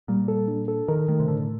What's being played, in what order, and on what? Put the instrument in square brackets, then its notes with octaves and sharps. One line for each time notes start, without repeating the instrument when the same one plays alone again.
[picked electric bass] A#2 [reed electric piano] G3
[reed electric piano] A4
D4
A4
[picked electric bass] D#3 [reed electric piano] A#4
[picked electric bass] D#3 [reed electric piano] A3
[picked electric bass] C3
[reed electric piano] A2 [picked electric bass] D3